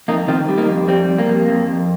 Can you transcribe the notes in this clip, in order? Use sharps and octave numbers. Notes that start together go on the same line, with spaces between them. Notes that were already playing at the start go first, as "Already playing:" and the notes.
F2 A#3 D#4
D#3 C4 F4
G3
A#3 D#4
F2
G3 C4
F2
A#3
F2
F2
F2